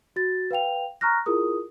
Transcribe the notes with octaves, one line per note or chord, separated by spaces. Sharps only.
F#4 A6
B4 F5 G5 F7
A#5 C#6 F6 F#6 A#6
E4 F4 G#4 A#4 D#6